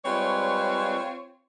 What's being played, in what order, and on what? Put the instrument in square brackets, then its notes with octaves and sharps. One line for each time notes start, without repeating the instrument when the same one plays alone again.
[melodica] G3 G#3 B4 [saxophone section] C4 F4 C#5